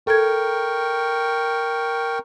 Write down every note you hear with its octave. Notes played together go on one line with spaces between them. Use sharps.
A4 A#4 G5 C#6 G#6